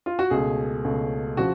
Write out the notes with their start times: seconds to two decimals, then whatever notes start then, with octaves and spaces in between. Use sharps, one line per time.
0.06 F4
0.19 F#4
0.30 C#2 B2 A3 G#4
0.84 C#2 B2 A3
1.37 C#3 F3 F#4